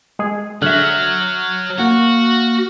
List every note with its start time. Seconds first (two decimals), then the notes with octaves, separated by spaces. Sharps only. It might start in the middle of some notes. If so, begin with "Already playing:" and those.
0.19 G#3 G#4
0.62 D3 F#3 E5 F6 F#6 F#7
1.79 A#3 F#4